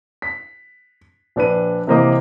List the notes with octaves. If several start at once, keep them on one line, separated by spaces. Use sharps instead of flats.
B6
A#1 D4 B4 D#7
C3 E3 A#3 C5 D#5 D6